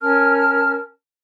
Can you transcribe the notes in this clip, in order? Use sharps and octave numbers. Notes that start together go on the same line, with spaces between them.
C#4 A#4 A5 F6